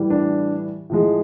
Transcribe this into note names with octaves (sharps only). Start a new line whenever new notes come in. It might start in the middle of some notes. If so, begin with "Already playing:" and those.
Already playing: A2 E3 G3
D4
A2 F3 G#3